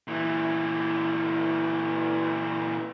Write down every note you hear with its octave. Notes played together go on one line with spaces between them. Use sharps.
A#2 E3